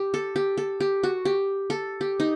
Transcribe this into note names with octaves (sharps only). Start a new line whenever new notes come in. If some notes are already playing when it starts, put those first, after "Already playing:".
Already playing: G4
A4
G4
A4
G4
F#4
G4
A4
G4
D#4